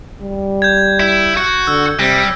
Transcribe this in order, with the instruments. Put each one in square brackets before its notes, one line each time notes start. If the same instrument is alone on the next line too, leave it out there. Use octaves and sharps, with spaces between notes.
[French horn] G3
[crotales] G6 G#6
[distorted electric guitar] E4
F#4
[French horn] D3 [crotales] E6
[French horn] C3 [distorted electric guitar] G3 [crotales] A#6